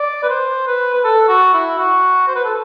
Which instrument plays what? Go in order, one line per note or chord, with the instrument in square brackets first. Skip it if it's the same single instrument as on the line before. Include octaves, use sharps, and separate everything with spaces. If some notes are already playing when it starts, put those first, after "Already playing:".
Already playing: [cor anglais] D5
B4
C5
B4
B4
A4
F#4
E4
F#4
C5
B4
A4